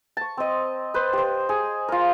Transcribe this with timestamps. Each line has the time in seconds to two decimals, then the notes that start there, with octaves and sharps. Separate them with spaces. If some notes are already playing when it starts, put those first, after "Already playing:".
0.17 A5 C#6
0.37 C4 D#5
0.94 B4 C5
1.13 G4 C5
1.49 G#4
1.88 F4 A#4